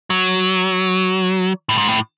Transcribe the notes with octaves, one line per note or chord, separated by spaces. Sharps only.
F#3
A2
G#2
A2